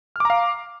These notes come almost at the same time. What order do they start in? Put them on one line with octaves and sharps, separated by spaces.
F6 D6 A#5 F5